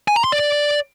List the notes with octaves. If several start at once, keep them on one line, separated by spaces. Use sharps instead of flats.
G#5
A#5
C6
D5